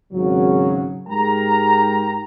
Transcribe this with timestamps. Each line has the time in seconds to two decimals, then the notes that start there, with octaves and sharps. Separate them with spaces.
0.13 G#1 C#3 F#3
1.09 G#2 G#3 G4 A#4 G5 A#5